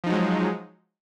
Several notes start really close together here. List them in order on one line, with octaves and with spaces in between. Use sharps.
F3 D#4 F#3 G#3